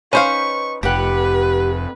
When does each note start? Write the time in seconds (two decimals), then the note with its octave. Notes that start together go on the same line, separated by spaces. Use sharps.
0.13 C#4 D#4 B4 C5 F5 C#6
0.83 F1 G4 B4 F#5